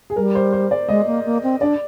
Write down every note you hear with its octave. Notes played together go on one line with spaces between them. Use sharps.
G#4
G3 A#4
C5
C5
D5
G#3 D#5
A#3
A#3
C4
D4 D5